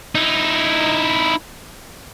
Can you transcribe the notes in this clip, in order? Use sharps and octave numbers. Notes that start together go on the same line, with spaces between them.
D#4 E4